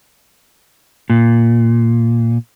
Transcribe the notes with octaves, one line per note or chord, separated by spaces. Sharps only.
A#2